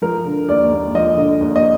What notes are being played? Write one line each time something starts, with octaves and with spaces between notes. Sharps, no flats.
F3 A#4
D3
D#2 D5
D#2
F3 D#5
D3
D#2
D#5